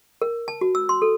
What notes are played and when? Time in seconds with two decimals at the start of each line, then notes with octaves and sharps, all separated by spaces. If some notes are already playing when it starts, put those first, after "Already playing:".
0.22 A#4
0.48 A5
0.61 F#4
0.75 E6
0.89 C6
1.02 A4